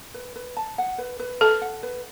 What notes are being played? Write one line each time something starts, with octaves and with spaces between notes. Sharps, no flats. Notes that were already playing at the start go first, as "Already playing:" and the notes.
B4
B4
A5
F#5
B4
B4
A4 A5
F#5
B4